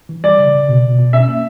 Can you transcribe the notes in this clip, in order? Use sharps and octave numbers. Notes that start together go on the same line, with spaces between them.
E3
G3 D5
C#3
C#3
B2
B2
B2
C#4 E5
A#3